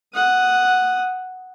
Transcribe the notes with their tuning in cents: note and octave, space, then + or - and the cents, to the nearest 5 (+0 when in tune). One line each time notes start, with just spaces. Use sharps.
F#5 +0 D#6 +0